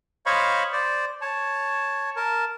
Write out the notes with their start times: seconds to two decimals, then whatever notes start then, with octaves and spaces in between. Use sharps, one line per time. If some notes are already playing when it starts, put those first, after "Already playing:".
0.26 C5 C#5 D#5 F5 B5 C#6
0.73 C5 D5
1.21 C#5 A5
2.16 A#4 A5